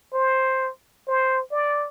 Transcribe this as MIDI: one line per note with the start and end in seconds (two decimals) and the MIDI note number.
0.13 0.70 72
1.08 1.42 72
1.51 1.88 74